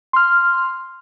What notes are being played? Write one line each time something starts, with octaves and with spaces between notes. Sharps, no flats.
C6 F6